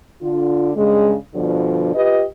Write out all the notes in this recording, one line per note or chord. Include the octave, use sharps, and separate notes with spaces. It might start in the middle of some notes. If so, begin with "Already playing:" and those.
D3 F4
G2 C#3 G#3
G2 B2 D3 F3
F4 G4 B4 D#5